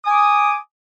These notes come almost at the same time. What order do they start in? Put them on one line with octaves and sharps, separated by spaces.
D#6 G#5 D6